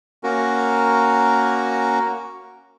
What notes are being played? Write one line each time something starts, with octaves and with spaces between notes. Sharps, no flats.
A#3 C#4 F#4 A#4